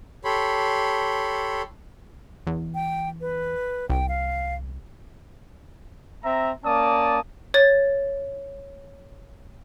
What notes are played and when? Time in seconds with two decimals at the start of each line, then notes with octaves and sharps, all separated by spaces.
0.25 G4 A4 C#5 B5 C6
2.47 E2
2.74 G5
3.21 B4
3.90 C2 G5
4.09 F5
6.24 C4 E5 A#5
6.64 A#3 C#4 D5 A5 D#6
7.54 C#5 A6